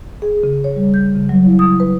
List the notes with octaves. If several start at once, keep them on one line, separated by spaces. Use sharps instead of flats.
G#4
C#3
C#5
G3
G6
C#3
F#3
E4
D#6
B4